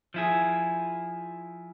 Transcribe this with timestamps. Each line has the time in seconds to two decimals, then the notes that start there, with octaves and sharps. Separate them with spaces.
0.14 F3 E4 G#4